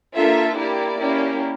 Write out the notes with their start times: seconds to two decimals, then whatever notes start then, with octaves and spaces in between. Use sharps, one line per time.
0.13 A#3 D4 F4 A4 E5
0.55 A#3 E4 G4 D5
0.99 A#3 C#4 E4 G4